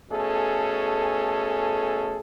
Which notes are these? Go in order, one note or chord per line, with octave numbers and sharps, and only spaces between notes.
B2 A3 C#4 G#4 A4